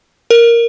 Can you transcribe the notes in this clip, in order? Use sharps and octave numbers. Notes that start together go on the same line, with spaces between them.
A#4